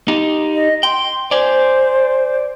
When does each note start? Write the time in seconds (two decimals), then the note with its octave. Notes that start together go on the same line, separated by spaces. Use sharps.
0.08 D#4 G4
0.55 D#5
0.83 G5 C6
1.31 C5 D5 G#5